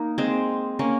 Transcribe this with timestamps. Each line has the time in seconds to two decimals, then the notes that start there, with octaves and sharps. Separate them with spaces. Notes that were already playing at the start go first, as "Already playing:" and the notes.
Already playing: A#3 D#4
0.18 G#3 C4
0.79 A#3 C#4